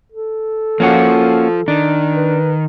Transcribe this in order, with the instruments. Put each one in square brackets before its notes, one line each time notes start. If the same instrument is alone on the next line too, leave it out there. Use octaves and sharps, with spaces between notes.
[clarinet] A4
[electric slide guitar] F3 F4 [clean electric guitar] A#3 C#4 F#4
[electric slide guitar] D#3 [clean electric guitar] D4
[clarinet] B4